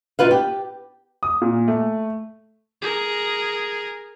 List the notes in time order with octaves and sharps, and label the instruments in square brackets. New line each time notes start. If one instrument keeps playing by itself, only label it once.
[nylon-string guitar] B2 F4 B4 F5
G4
[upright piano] D#6
A#2
A3
[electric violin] G#4 A#4